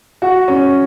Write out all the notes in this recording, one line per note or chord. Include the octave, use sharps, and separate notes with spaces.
F#4
C#4